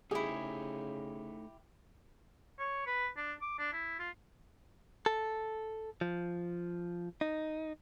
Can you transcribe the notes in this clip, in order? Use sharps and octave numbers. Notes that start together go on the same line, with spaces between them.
C#3 A3 D#4 E4 G4 G#4
C#5
B4
D4
D6
D4
E4
F4
A4
F3
D#4